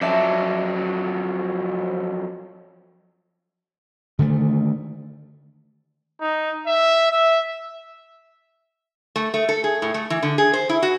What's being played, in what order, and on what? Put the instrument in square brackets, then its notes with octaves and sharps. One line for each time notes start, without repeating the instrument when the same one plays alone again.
[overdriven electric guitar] F2 F#3 [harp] D5 E5 A5
[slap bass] D3 D#3 G#3 A3
[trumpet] D#4
E5
E5
[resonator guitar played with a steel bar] A3
A3
A4
G#4
A2
A3
E3
D3
G#4
C5
E4
F#4